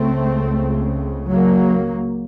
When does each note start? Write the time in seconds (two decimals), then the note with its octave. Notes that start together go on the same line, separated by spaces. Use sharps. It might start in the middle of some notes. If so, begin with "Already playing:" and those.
Already playing: C#2 C#3 A3 C4
1.30 F#3 A#3